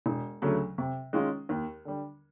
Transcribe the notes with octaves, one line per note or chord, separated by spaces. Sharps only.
E1
D2 C#3 F#3 A3
C3
D#3 G#3 C#4 F4
D#2
D3 G3